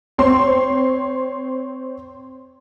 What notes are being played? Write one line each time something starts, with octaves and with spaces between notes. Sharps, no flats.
C4 C#5 C6